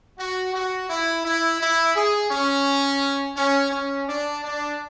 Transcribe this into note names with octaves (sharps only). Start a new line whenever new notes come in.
F#4
F#4
E4
E4
E4
G#4
C#4
C#4
C#4
D4
D4